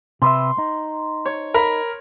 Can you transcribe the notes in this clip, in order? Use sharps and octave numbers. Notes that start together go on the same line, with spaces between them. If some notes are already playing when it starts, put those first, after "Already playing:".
C3 B4 E5 C6
D#4
C#5
A#4 B5